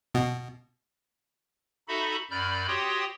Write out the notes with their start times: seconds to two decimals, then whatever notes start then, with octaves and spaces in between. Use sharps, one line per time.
0.14 B2
1.88 D#4 F#4 A4 E5 B5
2.31 F#2 D5 B5 F6 G6
2.68 F#4 G4 C#5 G5 C6 D#6